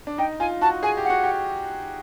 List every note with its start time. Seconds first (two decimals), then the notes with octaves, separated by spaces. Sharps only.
0.07 D4
0.18 D#4 G5
0.40 F4 G#5
0.61 F#4 A5
0.83 G#4 G#5
0.97 G4
1.05 F#4 F#5
1.24 G4